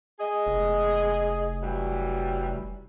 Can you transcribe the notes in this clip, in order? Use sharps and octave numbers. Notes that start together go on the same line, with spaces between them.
G#4 D#5
F1
E3 F#3 G3